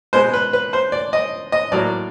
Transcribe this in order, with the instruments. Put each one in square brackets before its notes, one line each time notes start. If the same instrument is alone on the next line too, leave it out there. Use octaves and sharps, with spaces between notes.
[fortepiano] B2 G#3 B3 C5
B4
B4
C5
D5
D#5
D#5
A2 F#3 A#3 D5